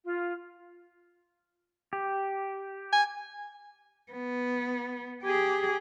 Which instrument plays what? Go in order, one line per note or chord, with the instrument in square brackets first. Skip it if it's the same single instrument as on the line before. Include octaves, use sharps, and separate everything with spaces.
[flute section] F4
[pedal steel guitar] G4
[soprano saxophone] G#5
[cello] B3
G4 G#4